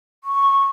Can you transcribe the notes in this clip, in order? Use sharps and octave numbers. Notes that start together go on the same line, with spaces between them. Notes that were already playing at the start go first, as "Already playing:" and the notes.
C#6